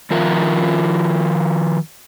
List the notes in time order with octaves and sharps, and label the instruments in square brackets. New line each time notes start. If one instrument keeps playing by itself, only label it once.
[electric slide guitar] D#3 F3 F4 A#4 E5